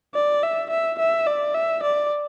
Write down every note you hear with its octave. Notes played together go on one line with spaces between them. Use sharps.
D5
E5
E5
E5
D5
E5
D5